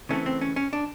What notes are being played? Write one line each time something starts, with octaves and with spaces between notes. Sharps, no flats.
C#3 E3 A3 C4 C#4
C4
C#4
C#4
D4